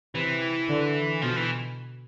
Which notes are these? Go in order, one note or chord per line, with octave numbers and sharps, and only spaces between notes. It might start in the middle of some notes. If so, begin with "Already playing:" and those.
C3 E3
D3
B2 F3
E3